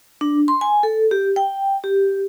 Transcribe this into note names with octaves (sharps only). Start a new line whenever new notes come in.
D4
C6
G#5
A4
G4
G5
G4